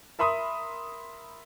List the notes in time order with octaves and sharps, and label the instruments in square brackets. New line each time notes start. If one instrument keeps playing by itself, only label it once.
[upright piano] A#4 E5 B5 C6 D#6